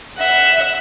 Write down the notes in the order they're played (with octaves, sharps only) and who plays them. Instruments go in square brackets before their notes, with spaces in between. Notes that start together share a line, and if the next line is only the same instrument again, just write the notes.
[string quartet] E5 F#5